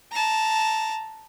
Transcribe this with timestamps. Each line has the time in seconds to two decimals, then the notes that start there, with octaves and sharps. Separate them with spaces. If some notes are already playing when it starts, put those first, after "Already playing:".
0.11 A5 A#5